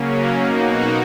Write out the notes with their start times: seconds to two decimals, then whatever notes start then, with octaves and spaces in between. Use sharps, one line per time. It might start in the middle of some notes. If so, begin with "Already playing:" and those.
Already playing: C#3 F#3 A#3 C#4
0.33 B2 A#3 D#4 F#4